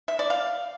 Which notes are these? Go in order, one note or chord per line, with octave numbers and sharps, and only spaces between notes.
E5
D5
F5